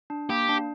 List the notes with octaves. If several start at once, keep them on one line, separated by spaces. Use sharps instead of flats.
D4
A#3 G4
D4